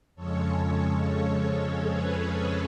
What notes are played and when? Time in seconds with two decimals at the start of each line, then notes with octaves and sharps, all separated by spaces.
0.15 F2 C#3 F3 G#3 C#4 A4 C#5
1.89 G#4 B4
2.34 G#4 B4